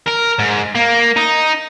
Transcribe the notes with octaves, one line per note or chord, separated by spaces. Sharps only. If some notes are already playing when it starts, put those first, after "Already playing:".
A#4
G#2
A#3
D#4